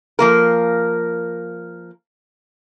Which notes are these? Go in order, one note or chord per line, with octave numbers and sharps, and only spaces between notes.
F3 A#3 A#4